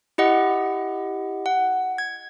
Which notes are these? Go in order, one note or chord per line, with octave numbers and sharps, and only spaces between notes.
E4 G4 D#5 F#5
F#5
G#6